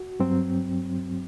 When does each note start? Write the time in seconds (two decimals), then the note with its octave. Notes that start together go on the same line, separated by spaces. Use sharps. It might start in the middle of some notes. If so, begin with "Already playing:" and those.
Already playing: F#4
0.20 G2 F#3 C4